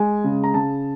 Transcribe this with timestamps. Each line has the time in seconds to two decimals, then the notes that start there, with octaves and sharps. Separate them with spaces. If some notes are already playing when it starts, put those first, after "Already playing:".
Already playing: G#3 G#5
0.24 C#3
0.44 A#5
0.54 C#3 A5